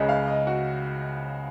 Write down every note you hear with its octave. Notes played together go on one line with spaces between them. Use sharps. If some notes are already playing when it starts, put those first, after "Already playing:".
Already playing: C#2 C#3 D#5
F5
D#5
F#4